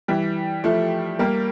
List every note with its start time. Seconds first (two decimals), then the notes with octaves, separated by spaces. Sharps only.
0.08 E3 G3
0.64 F3 A3
1.19 G3 A#3